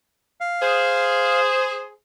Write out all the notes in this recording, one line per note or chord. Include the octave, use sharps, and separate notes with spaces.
F5
G#4 C5